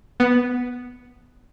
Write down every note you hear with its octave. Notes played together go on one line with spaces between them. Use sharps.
B3